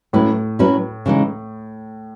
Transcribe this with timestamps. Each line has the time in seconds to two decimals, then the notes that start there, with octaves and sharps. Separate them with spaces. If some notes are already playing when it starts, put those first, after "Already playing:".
0.13 A2 F#3 C#4 E4 B4
0.59 F#3 C#4 E4 B4
1.06 C#3 E3 G#3 D#4